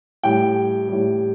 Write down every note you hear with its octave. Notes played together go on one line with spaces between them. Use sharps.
A2 G3 G5
A2 G3